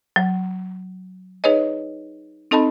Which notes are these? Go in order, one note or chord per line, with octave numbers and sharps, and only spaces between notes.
F#3
D#4 G#4 B4 C#5 D#5
C4 D#4 A4 D#5 A5 B5